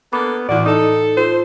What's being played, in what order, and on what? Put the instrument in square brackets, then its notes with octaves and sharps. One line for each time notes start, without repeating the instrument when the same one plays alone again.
[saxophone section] A#3 D4 A4 [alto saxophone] B3 [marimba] B5 D6
[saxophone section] D2 F#4 [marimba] A2 E3 E4 [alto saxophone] D5
[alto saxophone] D#4 [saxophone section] A4
[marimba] F4 [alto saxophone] C5